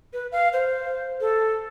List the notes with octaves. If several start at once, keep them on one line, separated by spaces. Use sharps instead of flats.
B4
F5
C5
A4